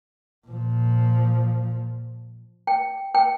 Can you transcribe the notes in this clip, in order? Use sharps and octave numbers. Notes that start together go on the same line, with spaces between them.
A#2 F3
G5
G5